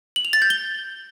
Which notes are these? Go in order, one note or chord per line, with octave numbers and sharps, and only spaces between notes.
F#7
F7
A6
G6
G7